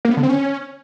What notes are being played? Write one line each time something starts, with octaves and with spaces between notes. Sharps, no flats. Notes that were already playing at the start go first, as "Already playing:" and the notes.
A#3
B3
D3
C4
C#4